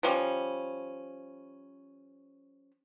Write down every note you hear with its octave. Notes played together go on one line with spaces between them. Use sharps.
F3 G3 C#4